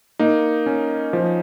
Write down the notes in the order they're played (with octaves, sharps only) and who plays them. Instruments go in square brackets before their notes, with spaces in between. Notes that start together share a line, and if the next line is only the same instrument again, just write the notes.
[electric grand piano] A#3 D#4
C#4
F3